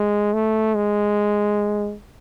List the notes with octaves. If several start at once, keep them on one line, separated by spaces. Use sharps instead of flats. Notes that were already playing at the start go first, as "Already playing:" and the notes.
Already playing: G#3
A3
G#3